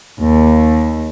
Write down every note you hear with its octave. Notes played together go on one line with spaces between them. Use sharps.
D#2